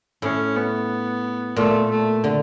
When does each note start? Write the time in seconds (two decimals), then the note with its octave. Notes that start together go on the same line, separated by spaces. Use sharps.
0.22 A2 C#4
0.56 B3
1.56 A#2 A3
1.90 A3
2.24 D3